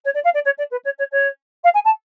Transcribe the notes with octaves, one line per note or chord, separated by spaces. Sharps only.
C#5
D5
F5
D5
C#5
D5
B4
C#5
C#5
C#5
F5
G#5
A5